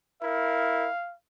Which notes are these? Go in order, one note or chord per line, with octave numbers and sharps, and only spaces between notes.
E4 A#4 F5